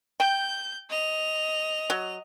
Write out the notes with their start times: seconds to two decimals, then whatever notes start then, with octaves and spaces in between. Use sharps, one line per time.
0.20 G5 G6
0.89 D#5 F7
1.90 F#3